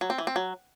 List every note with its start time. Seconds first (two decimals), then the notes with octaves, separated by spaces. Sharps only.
0.01 F#3
0.10 C4
0.18 E3
0.27 C4
0.36 F#3